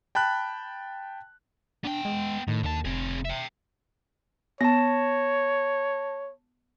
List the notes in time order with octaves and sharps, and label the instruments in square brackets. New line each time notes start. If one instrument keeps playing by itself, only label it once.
[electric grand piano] G5 A5 B5 F#6
[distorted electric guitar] B3 G5 [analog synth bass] D4
[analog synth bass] G#3
[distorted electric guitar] A2 [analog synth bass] D#3
[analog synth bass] D#2 [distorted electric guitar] D3 A5
[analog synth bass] F1 [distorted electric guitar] C4 G#4
[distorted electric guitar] E5 G5
[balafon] B3 [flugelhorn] C#5 [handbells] A5 A#6